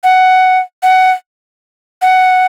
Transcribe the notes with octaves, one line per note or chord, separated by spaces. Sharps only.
F#5
F#5
F#5